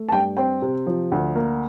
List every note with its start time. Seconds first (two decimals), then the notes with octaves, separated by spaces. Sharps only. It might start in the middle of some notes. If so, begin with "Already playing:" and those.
Already playing: A3
0.09 A5
0.12 G2 G5
0.37 C4 G5
0.62 C3
0.87 F3
1.12 D2
1.35 A#3